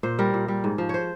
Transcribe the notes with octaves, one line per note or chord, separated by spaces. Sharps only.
A#2 C5
G3 A#4
A#2
G3
G#2
F3
C5 C#5